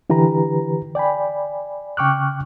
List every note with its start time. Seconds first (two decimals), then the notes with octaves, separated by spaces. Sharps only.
0.10 D3 E3 G4 B4 A#5
0.95 D5 G5 G#5 B5
1.97 C#3 G5 C#6 D6 F6 F#6